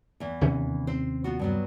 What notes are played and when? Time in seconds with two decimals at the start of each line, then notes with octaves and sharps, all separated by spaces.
0.20 E2 E3
0.41 D#2 C3 C#4
0.87 C4 C5
1.24 B3 F4 F#4
1.39 G2 F#3 B3